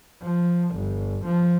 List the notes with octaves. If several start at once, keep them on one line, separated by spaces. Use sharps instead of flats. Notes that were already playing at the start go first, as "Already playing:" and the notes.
F3
G1
F3